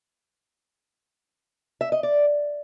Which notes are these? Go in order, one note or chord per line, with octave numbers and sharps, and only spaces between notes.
E5
D#5
D5